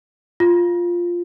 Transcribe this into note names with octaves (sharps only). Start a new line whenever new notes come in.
F4